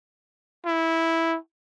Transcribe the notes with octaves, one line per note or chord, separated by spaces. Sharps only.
E4